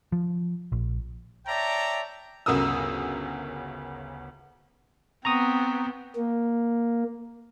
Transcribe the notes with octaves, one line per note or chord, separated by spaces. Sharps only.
F3
A#1
C#5 D5 E5 G5 A5 A#5
G1 D2 C#3 A#4 D#6 E6
B3 C4 A#5 C#6 D#6
A#3